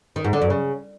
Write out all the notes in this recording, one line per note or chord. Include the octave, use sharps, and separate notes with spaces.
D#3
G#2
D3
F#2
C#3